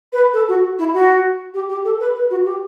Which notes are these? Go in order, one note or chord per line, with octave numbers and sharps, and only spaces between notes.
B4
A4
F#4
E4
F#4
G4
G4
A4
B4
B4
F#4
G4